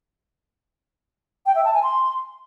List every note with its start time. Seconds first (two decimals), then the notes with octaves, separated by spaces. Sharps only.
1.46 G5
1.55 E5
1.65 A5
1.74 G#5
1.83 C6